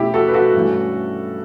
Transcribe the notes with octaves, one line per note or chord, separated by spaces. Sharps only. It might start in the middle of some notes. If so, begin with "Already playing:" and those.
Already playing: B2 A3 C#4 E4 G4
F#4 A4
B4
F#4 A4
G2 E3 A3 C#4